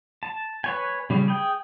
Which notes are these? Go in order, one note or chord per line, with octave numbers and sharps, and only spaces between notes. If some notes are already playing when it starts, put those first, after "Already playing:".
A5
B4 C#5 G#5
C#3 G3
G#4 G5